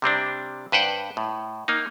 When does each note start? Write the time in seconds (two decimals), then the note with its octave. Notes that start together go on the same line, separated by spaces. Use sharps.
0.02 C3 G3 C4 D4
0.72 G2 B4 C5 F#5 G5
1.17 A2
1.68 A#3 D#4